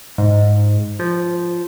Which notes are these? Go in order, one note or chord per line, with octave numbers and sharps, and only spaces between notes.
G#2
F3